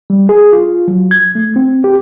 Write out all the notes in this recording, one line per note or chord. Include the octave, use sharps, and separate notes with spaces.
G3
G#4
F4
F#3
G#6
A3
C4
G4